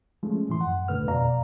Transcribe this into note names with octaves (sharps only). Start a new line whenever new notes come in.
F3 G#3 A3 C#4
A2 E3 C6
F#2 F#5
D2 A#2 D3 A3 B4 F6
F2 B2 D5 F5 A#5